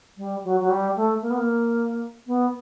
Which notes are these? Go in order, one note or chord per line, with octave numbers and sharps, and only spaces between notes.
G3
F#3
F#3
G3
A3
A#3
B3
A#3
B3